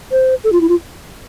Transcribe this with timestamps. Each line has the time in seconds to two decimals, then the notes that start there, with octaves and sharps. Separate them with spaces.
0.11 C5
0.44 A4
0.52 F4
0.61 E4
0.69 F4